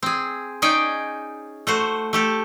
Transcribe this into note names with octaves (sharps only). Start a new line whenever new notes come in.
C4 G#4
C#4 D#4 G#4 D5 G5
A3 F#4 C5
A3 G4 A4